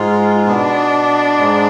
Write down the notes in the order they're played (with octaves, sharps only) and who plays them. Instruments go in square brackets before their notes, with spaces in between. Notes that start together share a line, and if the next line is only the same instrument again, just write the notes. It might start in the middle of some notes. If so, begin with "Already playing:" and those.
Already playing: [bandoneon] G#2 G#3 [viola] F4
[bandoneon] B2 B3 [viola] D4
[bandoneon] G#2 G#3